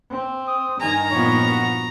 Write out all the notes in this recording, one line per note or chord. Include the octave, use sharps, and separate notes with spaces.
C4
D#6
G2 D#3 G#5 A#5
A#2 F3 B3 C#5
F#4